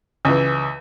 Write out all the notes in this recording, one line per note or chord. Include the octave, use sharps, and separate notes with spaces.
C#2 E3